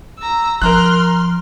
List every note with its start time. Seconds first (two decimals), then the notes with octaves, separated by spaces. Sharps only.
0.19 A#5 E6
0.62 F3 A#4 A#5 C6 F6 F#6